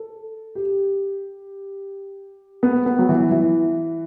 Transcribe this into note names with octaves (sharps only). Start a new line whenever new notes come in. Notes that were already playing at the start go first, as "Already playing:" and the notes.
Already playing: A4
G4
B3
B3
F#3
E3
E3